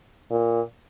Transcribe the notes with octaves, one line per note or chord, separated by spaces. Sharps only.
A#2